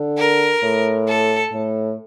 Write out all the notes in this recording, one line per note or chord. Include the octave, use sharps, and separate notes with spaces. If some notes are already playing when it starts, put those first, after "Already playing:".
Already playing: D3
A#4
A2
A4
A2